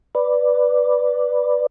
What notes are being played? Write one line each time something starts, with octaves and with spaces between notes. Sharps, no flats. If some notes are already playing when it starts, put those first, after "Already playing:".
B4 D5